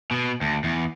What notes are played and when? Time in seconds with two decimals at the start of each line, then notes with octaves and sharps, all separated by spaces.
0.11 B2
0.41 D2
0.64 E2